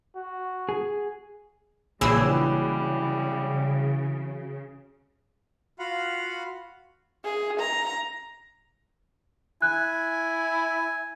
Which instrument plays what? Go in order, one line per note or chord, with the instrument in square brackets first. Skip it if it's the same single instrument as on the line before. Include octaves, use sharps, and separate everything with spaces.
[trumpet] F#4
[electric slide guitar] G#4
[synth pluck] A#1 G#4 E6 [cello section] C#3 [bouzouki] E3 F#3 D#5 [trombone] G3
[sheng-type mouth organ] F4 F#4 F5 F#5 B5
[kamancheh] G#4
A#5
[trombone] E4 [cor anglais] G#5 [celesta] F#6